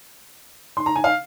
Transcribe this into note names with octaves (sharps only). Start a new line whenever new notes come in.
C6
A#5
G#5
F5